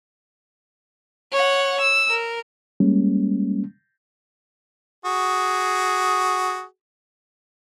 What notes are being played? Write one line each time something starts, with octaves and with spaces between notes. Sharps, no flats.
C#5 F#5
E6
A#4
G3 G#3 A#3 C#4
F#4 G#4